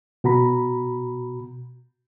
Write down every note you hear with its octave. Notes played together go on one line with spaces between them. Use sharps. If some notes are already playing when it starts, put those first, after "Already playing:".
B2 F#4 A#5 B5